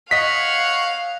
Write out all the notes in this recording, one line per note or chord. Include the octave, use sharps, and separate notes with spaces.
C#5 D#5 F5 F#5 B6